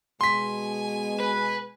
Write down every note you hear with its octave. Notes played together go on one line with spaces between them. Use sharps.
B2 G#3 G#5 C6 B6
B4